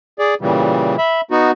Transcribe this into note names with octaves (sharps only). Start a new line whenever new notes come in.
G#4 D5
A#2 C#3 E3 G3
E5 B5
B3 D#4 F#4